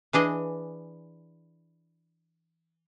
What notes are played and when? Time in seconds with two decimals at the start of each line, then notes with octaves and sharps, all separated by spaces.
0.13 E3 D4 G#4 D#5